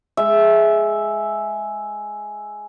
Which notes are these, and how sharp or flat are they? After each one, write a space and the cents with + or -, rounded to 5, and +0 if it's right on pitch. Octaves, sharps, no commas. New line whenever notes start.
G#3 +10 E5 +0